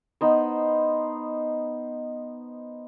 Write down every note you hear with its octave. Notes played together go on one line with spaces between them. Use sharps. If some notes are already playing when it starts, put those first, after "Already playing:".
B3 D#4 C5